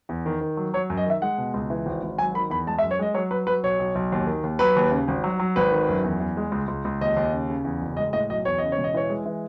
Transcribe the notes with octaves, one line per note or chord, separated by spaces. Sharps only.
E2
D#3
D#3
F#3
F#3 C#5
F#2
D#5
D#3 E5
G#3 F#5
B2
C#2
E3
G#1
G#1
F#3 G#5
D#3 B5
E2 B5
G#3 A5
E5
F#2
C#5
G#3 D#5
F#3 C#5
F#3 B4
F#3 B4
B1 C#5
B1
B1
D#2
D#3
D#2
F#3 B4
D#2
C#3
G#1
F#3
F#3
G#1 B4
D#3
F#2
E2
E2
G#3
C#2
C#2
C#2
D#2 D#5
D#2
C#3
C#3
E2
F#1
G#3 D#5
A2 D#5
B1 D#5
E2 C#5
C#3 D#5
C#5
E1
D#5
E3 C#5
G#3
E3